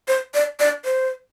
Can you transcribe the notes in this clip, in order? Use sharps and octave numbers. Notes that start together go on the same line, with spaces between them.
C5
D5
D5
C5